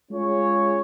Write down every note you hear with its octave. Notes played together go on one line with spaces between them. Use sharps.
G#3 C#4 F4 G#4 C#5